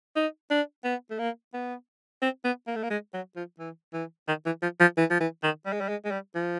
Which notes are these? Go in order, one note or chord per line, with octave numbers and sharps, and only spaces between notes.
D#4
D4
B3
A3
A#3
B3
C4
B3
A#3
A3
A#3
G#3
F#3
F3
E3
E3
D#3
E3
F3
F3
E3
F3
E3
D#3
G3
G#3
G3
G#3
G#3
G3
F3